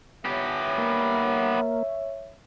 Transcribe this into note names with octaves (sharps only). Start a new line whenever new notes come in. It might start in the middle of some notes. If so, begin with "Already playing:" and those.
B3 G4 C#5 E5
A#3